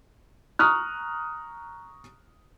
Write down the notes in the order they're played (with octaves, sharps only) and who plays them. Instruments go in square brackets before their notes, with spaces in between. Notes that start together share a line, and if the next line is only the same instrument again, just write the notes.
[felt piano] A#5 C#6 D#6 F6 F#6